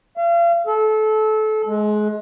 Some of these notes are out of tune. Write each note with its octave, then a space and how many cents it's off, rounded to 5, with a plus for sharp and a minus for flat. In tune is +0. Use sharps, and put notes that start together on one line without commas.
F5 -35
A4 -25
G#3 +25